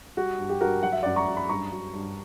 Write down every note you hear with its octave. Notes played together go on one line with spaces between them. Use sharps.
G3 F#4
G2
G4
G2 F#4 A#4
F#3 F#5
E5
F#2 D5 F#5
A#5 C#6
F#2
B5
G2 A#5 C#6
F#3
G2